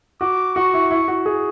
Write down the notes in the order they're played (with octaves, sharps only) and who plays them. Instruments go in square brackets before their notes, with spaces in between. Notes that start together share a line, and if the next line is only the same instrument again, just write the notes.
[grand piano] F#4 [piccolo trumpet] D6
[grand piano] F#4 [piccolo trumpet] C#6
[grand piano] E4
E4
F#4
G#4